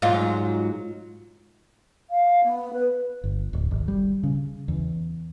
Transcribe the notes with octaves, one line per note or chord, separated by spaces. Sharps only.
G#2 F#3 F4
F5
B3
B4
G1
D1
G#1
G3
C#3
E2